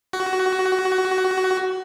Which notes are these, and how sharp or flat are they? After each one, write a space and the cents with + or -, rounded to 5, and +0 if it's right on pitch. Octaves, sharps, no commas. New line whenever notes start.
F#4 +20